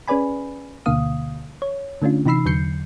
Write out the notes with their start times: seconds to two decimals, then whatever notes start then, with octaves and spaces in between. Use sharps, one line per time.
0.08 C#4 G#4 B4 D5 G#5 B5
0.86 D2 B2 D3 A#3 F5 D#6
1.62 C#5
2.02 D3 A3 C#4 D4 F4
2.26 C3 E3 D#4 B5 E6 C7
2.46 E2 D3 F#3 G6 C7 C#7